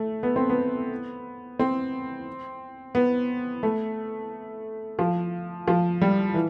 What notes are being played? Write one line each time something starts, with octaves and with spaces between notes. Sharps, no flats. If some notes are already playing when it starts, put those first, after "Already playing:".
Already playing: A3
B3
C4
B3
C4
B3
A3
F3
F3
G3
E3